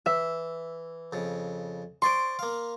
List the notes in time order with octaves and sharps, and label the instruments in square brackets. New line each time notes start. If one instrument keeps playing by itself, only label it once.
[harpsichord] E3 [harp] E5
[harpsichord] F2 C#3
[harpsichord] C5 D5 C#6 [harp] C6 D7
[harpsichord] A#3 F5